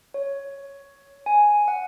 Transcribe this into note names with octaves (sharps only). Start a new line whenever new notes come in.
C#5
G#5
F#5